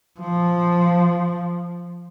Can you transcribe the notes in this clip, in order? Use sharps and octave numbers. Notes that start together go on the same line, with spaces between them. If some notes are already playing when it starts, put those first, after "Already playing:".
F3